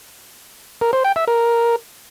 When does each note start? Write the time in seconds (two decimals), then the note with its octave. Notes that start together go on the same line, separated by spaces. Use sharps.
0.81 A#4
0.93 C5
1.04 G5
1.16 E5
1.28 A#4